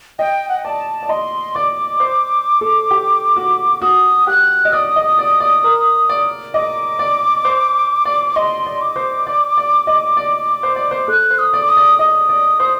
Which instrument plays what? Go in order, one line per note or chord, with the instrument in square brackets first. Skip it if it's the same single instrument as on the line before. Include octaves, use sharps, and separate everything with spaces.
[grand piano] D#5 [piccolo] G5
[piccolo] F#5
G5
[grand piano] D5 [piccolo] A5
[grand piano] D5
[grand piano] D#5 [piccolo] C6
[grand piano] D5 [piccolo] D6
[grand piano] C5
A4
G4
F#4
[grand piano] F#4 [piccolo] D#6
[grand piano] G4 [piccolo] F#6
[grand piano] D#5
[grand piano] D5 [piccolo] D#6
[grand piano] D#5
D5
D5
A#4
D5
[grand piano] D#5 [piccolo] D6
[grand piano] D5
C5
D5
[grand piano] D#5 [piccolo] C6
[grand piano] D5
[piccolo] D6
[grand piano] C5
D5
D5
D#5
D5
C5
D5
C5
[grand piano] A4 [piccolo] F#6
[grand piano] C5
[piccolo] D#6
[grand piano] D5
[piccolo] D6
D#6
[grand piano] D5
[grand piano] D#5 [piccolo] D#6
[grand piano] D5
C5